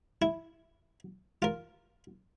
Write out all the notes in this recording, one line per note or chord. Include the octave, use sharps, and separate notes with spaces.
E4
F4 A#4